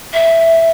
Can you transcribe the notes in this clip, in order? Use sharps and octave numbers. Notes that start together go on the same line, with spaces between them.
E5